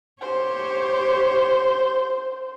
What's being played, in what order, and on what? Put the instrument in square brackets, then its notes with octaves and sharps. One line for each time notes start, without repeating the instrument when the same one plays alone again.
[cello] G4 C#5 [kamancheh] C5